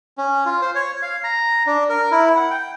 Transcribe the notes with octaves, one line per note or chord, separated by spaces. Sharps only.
C#4
F4
C5
C#5
F5
A#5
D4
A#4
E4
F#5
G5